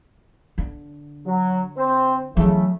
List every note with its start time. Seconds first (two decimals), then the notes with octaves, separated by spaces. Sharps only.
0.58 D3
1.26 F#3
1.77 C4 C5
2.37 C#3 E3 F#3 A3